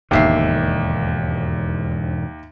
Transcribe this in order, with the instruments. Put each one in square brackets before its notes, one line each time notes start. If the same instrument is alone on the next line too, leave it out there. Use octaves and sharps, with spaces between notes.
[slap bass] E1 G#2 D3 [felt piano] D#2 E5 C7